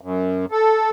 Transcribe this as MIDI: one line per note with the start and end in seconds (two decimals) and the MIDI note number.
0.01 0.45 42
0.51 0.90 69